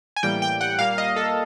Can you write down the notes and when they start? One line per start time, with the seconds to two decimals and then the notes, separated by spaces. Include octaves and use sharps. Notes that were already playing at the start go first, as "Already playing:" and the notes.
0.16 G#5
0.23 A2 E3 G3 A#3 G5
0.42 G5
0.61 F#5
0.79 A#2 G3 A#3 F5
0.98 D#5
1.16 A4